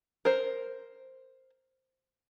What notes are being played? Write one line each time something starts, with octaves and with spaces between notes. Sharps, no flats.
A#4 C5